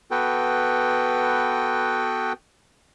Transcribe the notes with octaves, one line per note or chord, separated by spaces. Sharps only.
B3 F#4 A4 B4 G5